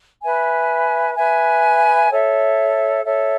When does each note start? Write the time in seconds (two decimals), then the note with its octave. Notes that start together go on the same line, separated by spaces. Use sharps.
0.22 B4 E5 G#5
1.16 B4 E5 G#5
2.10 A4 C#5 E5
3.03 A4 C#5 E5